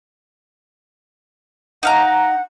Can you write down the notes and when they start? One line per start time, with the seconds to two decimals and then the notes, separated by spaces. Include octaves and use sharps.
1.83 D#4 F5 F#5 A#5